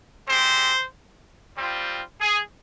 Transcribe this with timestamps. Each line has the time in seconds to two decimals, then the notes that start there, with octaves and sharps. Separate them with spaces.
0.27 G#3 C4 G4 C5
1.56 G3 C4 F4
2.21 G#4